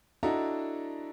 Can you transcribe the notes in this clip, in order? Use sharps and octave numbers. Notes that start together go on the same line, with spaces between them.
D4 E4 F#4 A4 D#5 A#5